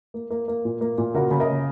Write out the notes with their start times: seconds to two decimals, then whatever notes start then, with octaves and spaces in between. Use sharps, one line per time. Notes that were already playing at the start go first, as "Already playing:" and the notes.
0.14 A#3
0.30 A#3
0.48 A#3
0.65 A#2
0.81 A#3
0.98 A#2
1.14 C#3 F#4 A#4
1.31 C#3
1.40 A#4 D#5
1.48 A#3